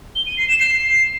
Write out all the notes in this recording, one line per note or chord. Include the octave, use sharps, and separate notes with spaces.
G7
D#7
C7
E7
C7